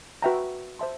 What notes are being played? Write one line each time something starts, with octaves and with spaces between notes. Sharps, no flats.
F#4 B4 E5 G5 A#5
C5 E5 A5 C6